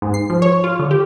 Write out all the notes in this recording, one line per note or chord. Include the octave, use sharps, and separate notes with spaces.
G#2
C7
F3
C#5
F4
D3
G4